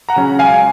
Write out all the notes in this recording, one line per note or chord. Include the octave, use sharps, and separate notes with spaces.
F#5 A#5
C#3 F#3 C#4
C#2 F5 G#5